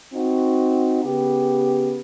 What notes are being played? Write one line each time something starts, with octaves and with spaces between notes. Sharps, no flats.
C4 D#4 F#4
C#3 B3 G4